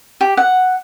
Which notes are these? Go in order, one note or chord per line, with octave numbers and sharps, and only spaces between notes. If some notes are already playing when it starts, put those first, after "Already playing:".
G4
F#5